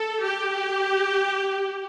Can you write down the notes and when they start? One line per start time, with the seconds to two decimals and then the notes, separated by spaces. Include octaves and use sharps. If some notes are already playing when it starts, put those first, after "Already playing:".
Already playing: A4
0.25 G4